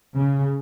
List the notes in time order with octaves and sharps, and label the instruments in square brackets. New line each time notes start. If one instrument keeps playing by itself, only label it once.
[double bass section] C#3